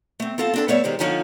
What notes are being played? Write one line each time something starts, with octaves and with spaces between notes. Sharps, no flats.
A3 C4
C4 F4 A4 F5 A5
C4 D4 A4
G2 A3 B3 C#5 D5 E5
D#3 G#3 G4 C5
D3 F3 C#4 D#4 F4 G#5